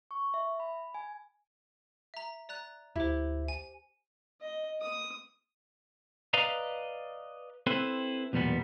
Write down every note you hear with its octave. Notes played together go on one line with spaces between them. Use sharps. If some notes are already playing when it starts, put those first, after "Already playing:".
C#6
E5
B5
G#5
E5 A#5
D5 A#5 F#6
D2 E4 G4 C5
G#5
D#5
D#6
B4 D5 D#5 F5 A#5
C4 E4 A4 B4 C5
B1 E2 A#2 G3 B3